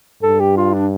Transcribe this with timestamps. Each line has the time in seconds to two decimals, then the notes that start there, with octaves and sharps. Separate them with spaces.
0.23 G2 A4
0.40 G4
0.57 F4
0.73 D4